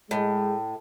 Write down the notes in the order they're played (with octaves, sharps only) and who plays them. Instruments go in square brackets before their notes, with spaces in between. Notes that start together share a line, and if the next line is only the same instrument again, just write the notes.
[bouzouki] A2 [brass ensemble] G#3